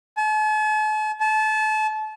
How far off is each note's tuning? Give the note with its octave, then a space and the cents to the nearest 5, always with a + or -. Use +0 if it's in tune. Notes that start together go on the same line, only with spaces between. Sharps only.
A5 -45
A5 -30